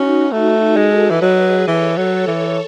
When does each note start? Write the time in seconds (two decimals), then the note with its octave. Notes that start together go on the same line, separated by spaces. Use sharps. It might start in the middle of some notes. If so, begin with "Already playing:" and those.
Already playing: C#4 D#4 F#4
0.31 A3 D#4 F#4
0.76 G#3 F#4 A4
1.07 E3 B4 D#5
1.22 F#3
1.36 G#4 B4
1.67 E3 A4 C#5
1.97 F#3
2.12 A4 C#5
2.27 E3